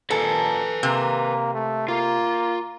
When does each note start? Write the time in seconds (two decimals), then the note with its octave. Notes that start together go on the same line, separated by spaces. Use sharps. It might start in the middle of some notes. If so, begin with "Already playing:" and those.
0.10 A#2 A4 B4 G#5 A#5
0.83 C3 A#3
1.54 A3
1.88 A#3 F4